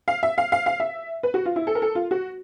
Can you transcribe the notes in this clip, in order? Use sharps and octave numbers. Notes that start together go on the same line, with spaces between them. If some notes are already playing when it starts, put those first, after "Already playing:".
F5
E5
F5
F5
F5
E5
B4
F#4
F4
E4
A4
A#4
A4
F4
F#4